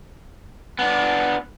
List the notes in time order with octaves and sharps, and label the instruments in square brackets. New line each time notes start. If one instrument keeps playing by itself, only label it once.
[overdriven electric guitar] B3 D4